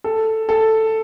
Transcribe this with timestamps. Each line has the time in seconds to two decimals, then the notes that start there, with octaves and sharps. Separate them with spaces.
0.04 A4
0.49 A4